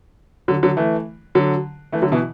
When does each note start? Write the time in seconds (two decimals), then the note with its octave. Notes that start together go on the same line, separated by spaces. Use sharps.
0.48 D3 F#3
0.63 D3 F#3
0.77 E3 A3
1.35 D3 F#3
1.92 E3 A3
2.02 D3 F#3
2.12 B2 E3